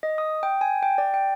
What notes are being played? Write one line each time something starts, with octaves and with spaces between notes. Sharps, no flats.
D#5
D#6
G5
G#5
G5
D5
G5